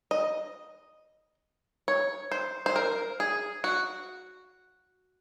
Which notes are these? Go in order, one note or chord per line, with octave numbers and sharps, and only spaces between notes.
D#5
C#5
C5
C5
A#4
G#4
F#4